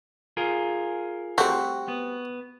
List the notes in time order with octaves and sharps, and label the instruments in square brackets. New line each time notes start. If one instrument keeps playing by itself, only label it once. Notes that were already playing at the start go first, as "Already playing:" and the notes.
[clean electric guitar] F4 G#4 A#4
[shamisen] G3 A3 C4 [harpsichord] F#4
[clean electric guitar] B3